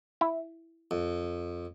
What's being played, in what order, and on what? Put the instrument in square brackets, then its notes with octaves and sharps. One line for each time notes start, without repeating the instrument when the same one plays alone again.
[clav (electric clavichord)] E4
[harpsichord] F2